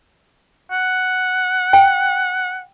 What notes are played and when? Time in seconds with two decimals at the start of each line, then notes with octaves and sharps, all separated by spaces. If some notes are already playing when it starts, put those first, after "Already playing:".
0.71 F#5
1.73 G5